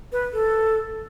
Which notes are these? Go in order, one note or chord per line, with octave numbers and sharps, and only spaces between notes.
B4
A4